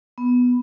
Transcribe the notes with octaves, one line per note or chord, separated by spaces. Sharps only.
B3